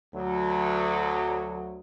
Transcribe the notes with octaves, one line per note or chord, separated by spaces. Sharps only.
D2 F#3